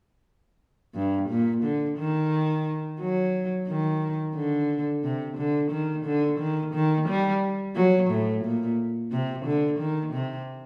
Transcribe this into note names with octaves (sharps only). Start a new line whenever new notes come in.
G2
A#2
D3
D#3
F#3
D#3
D3
C3
D3
D#3
D3
D#3
D#3
G3
F#3
A2
A#2
C3
D3
D#3
C3